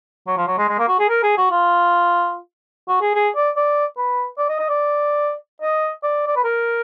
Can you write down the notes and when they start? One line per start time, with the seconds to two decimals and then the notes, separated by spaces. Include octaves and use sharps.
0.27 F#3
0.37 F3
0.47 F#3
0.58 G#3
0.68 G#3
0.79 A#3
0.88 F#4
0.99 G#4
1.09 A#4
1.23 G#4
1.37 F#4
1.51 F4
2.88 F#4
3.01 G#4
3.15 G#4
3.36 D5
3.56 D5
3.98 B4
4.38 D5
4.49 D#5
4.59 D#5
4.69 D5
5.62 D#5
6.03 D5
6.27 D5
6.36 B4
6.44 A#4